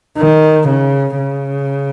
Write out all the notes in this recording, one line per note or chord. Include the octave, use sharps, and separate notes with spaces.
D#3
C#3
C#3